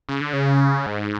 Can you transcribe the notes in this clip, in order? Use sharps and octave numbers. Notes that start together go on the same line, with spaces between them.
C#3
D3
C#3
G#2